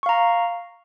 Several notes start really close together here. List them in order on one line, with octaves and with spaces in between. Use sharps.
C#6 F5 A#5